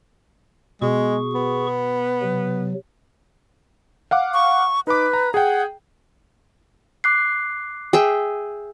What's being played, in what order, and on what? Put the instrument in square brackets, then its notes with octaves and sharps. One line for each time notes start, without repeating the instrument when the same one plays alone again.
[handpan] B2 [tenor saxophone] G#3 [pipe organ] G#4 C#6
[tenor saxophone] B3
[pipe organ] C3 F#3
[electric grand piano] F5 F#5 D6
[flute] C#6
[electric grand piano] D#4 D6 [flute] B4
[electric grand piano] A#5
[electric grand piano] G#4 G5 [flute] F#5
[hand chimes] D6 F#6 C7
[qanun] G#4 E5 G5